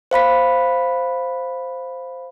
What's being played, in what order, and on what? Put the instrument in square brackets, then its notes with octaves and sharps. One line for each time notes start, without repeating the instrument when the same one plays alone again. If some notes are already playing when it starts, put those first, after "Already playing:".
[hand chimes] C5 F5 B5 B6